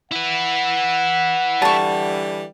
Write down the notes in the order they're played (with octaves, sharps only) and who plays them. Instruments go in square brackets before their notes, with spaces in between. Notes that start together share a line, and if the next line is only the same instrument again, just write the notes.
[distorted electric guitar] E4 B4 [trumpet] F#5
[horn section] D3 E3 G3 [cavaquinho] A5 C#6